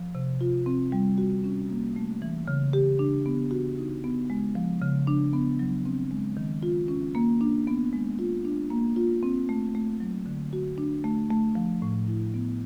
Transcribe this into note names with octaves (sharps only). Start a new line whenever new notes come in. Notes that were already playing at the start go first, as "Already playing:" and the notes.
Already playing: F3
C3
F4
C4
G3
F#4
C#4
A#3
A3
E3
C#3
G4
D4
B3
F#4
D#4
B3
G#3
F3
C#3
D4
B3
F#3
C4
G#3
D#3
F4
C#4
A#3
D4
B3
G#3
F4
D4
A#3
F4
C4
A3
A3
F#3
D3
F#4
D4
A3
A3
F3
A2
E4
B3